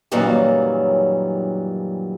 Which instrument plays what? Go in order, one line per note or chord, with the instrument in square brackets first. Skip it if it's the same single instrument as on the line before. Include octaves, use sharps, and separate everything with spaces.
[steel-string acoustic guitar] F#2 A#2 D#3 E3 F#3 G3